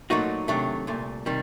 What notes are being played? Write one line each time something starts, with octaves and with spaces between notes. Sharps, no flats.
A#2 F#3 A3 D#4 F#4
C3 D#3 F#3 A3 D4
C2 A#2 A3
C3 D#3 G3